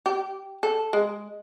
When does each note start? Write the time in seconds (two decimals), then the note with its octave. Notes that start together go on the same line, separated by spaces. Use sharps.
0.06 G4
0.63 A4
0.93 G#3